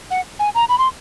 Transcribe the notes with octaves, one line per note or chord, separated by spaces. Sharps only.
F#5
G#5
A#5
B5
C6